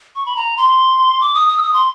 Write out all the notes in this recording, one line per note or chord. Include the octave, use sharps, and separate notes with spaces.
C#6
B5
A#5
C6
D6
D#6
D#6
E6
D#6
C6